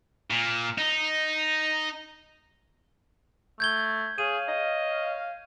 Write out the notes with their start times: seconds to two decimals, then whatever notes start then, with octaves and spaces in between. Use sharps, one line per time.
0.31 A#2
0.78 D#4
3.60 A3 G6 G#6 G7
4.18 G#4 C#5 F5 D#7
4.48 D#5